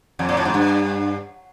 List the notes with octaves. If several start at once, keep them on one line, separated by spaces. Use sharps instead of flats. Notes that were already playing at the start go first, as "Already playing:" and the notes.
F2
A#2
A2
G#2
G2